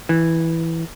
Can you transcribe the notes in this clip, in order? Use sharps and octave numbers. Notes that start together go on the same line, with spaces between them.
E3